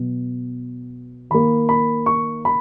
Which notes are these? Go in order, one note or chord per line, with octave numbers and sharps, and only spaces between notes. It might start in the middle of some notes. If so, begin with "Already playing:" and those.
Already playing: B2 F#3 B3
D#3 A#3 B5
B5
C#6
B5